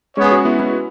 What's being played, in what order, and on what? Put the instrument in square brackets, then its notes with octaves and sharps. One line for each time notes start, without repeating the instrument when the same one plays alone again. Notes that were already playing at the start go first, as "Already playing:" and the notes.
[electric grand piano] G#3 C#4 [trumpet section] B3 G#4 C#5
[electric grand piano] C#4 F#4
B3 E4
B3 E4